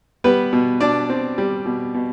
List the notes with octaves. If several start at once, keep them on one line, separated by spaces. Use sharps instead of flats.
G3 B3 B4
B2
B2 D4 D5
C4
G3
B2
B2